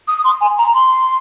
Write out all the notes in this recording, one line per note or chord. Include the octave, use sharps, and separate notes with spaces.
D#6
C6
G#5
A#5
C6